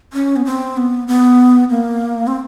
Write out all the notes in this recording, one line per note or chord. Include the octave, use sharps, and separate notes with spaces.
C#4
B3
C4
B3
B3
A#3
C4